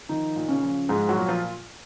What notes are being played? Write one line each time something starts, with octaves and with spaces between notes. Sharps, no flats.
D#3 F3 D#4
A#2
C#3 C#4
F3
G#2 F3 G#3
F#3 F#4
A#2
F3 F4